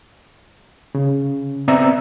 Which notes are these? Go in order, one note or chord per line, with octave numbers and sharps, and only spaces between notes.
C#3
B3 C4 D5 E5 A#5 E6